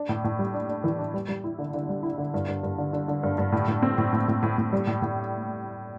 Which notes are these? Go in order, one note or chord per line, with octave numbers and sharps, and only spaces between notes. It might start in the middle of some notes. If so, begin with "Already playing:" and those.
Already playing: D4
A2
A2
G3
D4
D4
E3
D4
G3
G3
E4
D3
D3
G3
E4
D3
G2
G2
G2
D3
D3
D3
G2
G2
A2
A2
C4
A2
A2
A2
A2
A2
G3
A2
A2